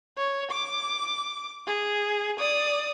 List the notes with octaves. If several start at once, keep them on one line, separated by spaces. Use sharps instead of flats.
C#5
D6
G#4
D5 D#6